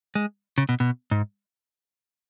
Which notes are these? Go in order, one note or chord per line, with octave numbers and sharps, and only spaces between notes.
G#3
C#3
B2
B2
G#2